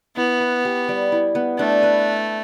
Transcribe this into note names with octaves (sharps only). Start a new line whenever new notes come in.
B3 E4
B4
G4
G3
E4
B3
A3 D4
B4